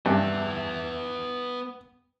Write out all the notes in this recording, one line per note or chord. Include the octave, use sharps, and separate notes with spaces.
G2 B3 E5